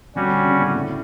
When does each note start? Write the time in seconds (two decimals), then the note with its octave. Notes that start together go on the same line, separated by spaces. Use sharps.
0.16 D3 G3 C#4 F#4
0.45 C#3
0.60 A2
0.74 A2